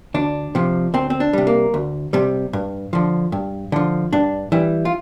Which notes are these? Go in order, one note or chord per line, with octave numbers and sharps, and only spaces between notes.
D2 D4
C3 F3
D2 C4
C4
D4
C3 G3
A#3
D2
C3 G3
G2
D3 F3
G2
D3 F3
G2 D4
E3 G3 E4
F4